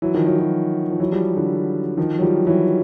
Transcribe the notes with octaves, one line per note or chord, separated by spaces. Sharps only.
E3 F#3
D#3 F3
E3 F#3
E3 F#3
F3
E3 F#3
F3 G3
D3 E3
D#3 F3
F#3
F3 G3
E3 F#3